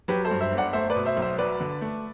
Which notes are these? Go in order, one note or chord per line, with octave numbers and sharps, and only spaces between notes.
F#3 G4 B4
A4 C5
G2
C5 E5
G1
D5 F#5
A3 C5 E5
B4 D5
B2
C5 E5
B1
C5 E5
F#3 B4 D5
D3
A3